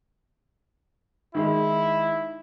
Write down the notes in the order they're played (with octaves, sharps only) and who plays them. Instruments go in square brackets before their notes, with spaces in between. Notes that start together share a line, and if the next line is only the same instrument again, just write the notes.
[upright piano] D#3 G#3 [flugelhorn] E4